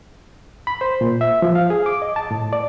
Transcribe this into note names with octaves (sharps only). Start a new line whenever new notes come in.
B5
C5
A#2
E5
F3
F5
G#4
D6
D#5
A5
A2
D5